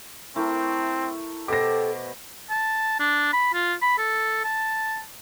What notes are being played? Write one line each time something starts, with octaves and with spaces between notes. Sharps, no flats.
A3 C4 E4 A#4
B2 G4 A4 C5 D6 A#6
A5
D4
B5
F4
B5
A4
A5